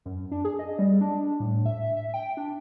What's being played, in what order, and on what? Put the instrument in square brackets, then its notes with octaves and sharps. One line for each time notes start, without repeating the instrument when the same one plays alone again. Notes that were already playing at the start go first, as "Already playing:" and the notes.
[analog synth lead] F#2
D4
G#4
D#5
G3
D4
A2
E5
E5
G5
D4